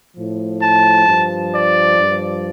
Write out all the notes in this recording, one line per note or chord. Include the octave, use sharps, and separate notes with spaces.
A2 F3
A5
G2 F3
D5
G2 F3